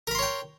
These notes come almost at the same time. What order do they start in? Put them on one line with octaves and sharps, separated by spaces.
A#4 B5 C6 C#5 G5